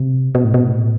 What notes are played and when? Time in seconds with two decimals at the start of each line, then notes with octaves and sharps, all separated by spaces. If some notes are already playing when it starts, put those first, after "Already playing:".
Already playing: C3
0.35 B2
0.45 A2
0.54 B2
0.64 A2